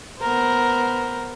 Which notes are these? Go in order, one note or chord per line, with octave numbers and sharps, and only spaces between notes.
B3 A#4 C5